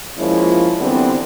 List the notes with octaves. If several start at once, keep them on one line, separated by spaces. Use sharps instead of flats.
F3 G#3 A#3 C#4 E4 F4
D3 E3 G3 B3 C4